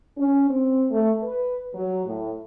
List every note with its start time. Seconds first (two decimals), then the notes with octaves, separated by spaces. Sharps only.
0.18 C#4
0.49 C4
0.90 A3
1.24 B4
1.75 F#3
2.06 A2